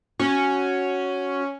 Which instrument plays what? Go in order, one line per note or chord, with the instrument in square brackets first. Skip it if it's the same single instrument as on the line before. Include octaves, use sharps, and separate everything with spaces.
[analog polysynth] C#4 [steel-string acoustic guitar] F#4